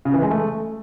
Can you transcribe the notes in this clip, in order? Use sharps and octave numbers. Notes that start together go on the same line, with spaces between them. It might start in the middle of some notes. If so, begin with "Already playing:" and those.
C#3
E3
G#3
A3